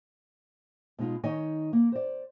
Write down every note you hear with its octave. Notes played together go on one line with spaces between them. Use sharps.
B2 G#3 D#4 F4
D#3 D#4 C#5 D#5 G#5
A#3
C5 D5